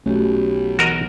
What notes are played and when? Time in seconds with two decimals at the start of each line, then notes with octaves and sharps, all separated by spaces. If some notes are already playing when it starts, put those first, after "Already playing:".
0.06 B1 A3 C#4 F#4 G4
0.79 E3 F#4 A#4 D#5